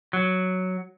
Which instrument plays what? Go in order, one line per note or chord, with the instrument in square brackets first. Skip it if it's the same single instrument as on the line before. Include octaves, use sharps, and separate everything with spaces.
[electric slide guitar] F#3